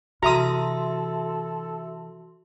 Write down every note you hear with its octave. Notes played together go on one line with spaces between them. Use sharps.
C3 E3 F#4 A4 E5 A#5 C6 D#6